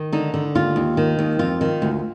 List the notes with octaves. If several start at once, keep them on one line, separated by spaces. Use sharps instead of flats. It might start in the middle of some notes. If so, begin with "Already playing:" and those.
Already playing: D#3
D3 D#4
D3
D#2 F4
D#2
D#3
D#2
F2 F4
D#3
D2